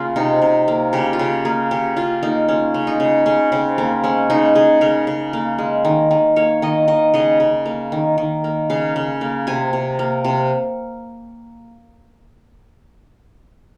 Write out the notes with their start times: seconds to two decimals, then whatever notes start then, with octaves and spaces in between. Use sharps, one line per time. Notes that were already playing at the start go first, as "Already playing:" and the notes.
Already playing: C#3 A#3 F4
0.16 C3 D#4
0.42 C3
0.68 A#3
0.93 C#3 G4
1.13 F4
1.19 C#3 G4
1.45 A#3 G#4
1.71 C#3 G4
1.96 C#3 F4
2.23 A#3 D#4
2.48 G#3 C#4
2.74 C#3
2.87 D#4
3.00 C#3
3.26 C#3 C#4
3.52 C#3 C4
3.78 A#3 C4
4.04 G#3 C#4
4.30 C#3 D#4
4.55 C#3 G#4
4.81 C#3 A#4
5.07 C#3
5.33 A#3
5.58 G#3
5.85 D#3
6.11 D#3
6.36 A#3 C#5
6.62 D#3 D#5
6.88 D#3 D#5
7.14 C#3 D#5
7.40 C#3
7.66 A#3
7.92 D#3
8.18 D#3
8.44 A#3
8.70 C#3 F5
8.96 C#3
9.21 A#3
9.47 C3 G#5
9.73 C3
9.99 A#3
10.24 C3